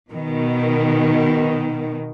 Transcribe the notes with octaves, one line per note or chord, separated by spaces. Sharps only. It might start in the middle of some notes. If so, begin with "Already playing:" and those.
B2 D#3